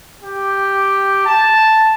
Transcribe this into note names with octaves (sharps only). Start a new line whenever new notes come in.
G4
A5